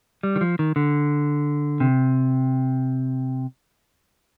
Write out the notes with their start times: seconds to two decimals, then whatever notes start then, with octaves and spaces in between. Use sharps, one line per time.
0.23 G3
0.36 D#3
0.41 F3
0.59 D#3
0.76 D3
1.80 C3